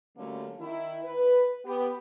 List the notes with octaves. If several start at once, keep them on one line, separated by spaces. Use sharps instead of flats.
D3 F#3 G3 A3 A#3 C#4
D#3 E4
B4
B3 G4